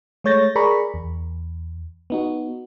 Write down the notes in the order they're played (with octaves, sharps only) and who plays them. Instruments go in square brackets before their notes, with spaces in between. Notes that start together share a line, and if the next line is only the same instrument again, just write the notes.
[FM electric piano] G#3 A3 C#5 G6 A6 A#6
G#4 A#4 D5 A#5 B5 C#6
E2
B3 D#4 F#4